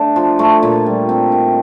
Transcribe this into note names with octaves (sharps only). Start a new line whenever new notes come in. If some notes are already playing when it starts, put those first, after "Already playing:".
Already playing: A3 D4 D5
F3
A3
A#2
G3
C4
D#3